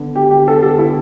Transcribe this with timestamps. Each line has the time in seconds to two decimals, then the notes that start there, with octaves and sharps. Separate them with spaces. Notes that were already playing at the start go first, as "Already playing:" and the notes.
Already playing: D3 B3 D4
0.16 G4
0.31 G4
0.47 D3 B3 D4 A4
0.63 A4
0.79 E4